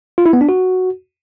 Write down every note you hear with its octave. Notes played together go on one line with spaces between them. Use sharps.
F4
E4
B3
D4
F#4